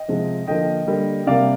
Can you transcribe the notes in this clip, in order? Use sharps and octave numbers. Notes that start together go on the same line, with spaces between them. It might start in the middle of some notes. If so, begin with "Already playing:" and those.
Already playing: D#5 G5
C3 F3 G#3 C4
D3 F3 A#3 D#5 G5
D3 G3 A#3
C3 G3 A#3 D5 F5